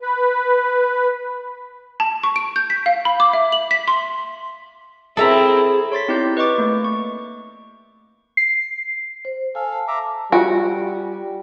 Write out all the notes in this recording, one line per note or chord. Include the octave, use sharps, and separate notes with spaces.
B4
A5
C#6
D7
G6
B6
F5
B5
D6
E5
F#7
B6
C6
C4 E4 G#4 A4 E5 A#5
C#5 C6 A6 B6
C4 D#4 E4 G4 D5 G6
B4 D#5 C#6 D6
A3 A#3
C#6
C7
C5
A4 F5 G#5
A5
E5 A#5 D6
G3 F4 F#4 G#5